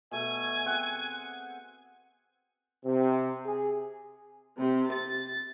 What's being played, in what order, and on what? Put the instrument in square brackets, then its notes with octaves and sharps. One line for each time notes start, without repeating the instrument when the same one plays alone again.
[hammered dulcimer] B2 A3 [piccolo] G#5
[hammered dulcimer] C4 G#4 F#5
[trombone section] C3
G#4
[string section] C3
A6